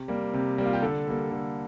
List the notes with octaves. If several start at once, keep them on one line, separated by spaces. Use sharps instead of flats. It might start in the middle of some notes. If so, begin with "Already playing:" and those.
Already playing: C3 G4
G3 A#3
C3
G3 A#3
F4
G4
D3 A4
G3 A#3
D3